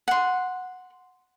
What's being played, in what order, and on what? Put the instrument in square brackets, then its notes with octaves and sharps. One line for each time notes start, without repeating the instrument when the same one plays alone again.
[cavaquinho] F#5 C6